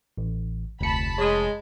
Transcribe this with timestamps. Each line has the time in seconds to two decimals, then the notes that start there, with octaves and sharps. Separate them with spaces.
0.18 A1
0.81 F1 D2 A5 B5 C#7
1.18 G#3 C#5 D#6